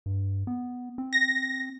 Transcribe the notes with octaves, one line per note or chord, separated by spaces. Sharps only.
G2
B3
C4
A#6